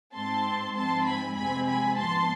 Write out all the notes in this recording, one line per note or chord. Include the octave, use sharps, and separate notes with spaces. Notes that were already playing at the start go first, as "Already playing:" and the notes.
G#2 G#3 C4 A5 C6
G#2 F3 G#3 C4 A5 C6
G#5 B5
F2 C3 G#3 C4 G#5 B5
G#5 B5
G#2 F3 B3 A5 C6